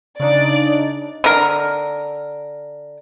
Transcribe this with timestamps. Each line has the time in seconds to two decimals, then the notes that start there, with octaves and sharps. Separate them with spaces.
0.19 C#3 D4 D#4 D5
1.24 D3 A#4